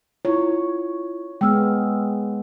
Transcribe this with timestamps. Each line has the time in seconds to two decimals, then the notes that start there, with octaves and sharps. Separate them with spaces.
0.25 E4 F4 C#5
1.41 G#3 B3 G5 E6 F6